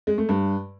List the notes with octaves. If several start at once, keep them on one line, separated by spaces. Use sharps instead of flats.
G#3
A3
G2